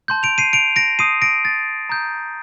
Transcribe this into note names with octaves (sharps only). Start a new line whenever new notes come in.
A5 C6 G6
D7 F7
C7 D#7
D7 F7
A#6 D7
A5 C6 D#6 G6 C7 D#7
A#6 D7
A6
A#5 D#6 G6